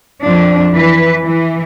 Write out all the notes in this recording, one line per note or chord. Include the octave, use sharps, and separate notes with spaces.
F2 F3 D4
E3 B4
E3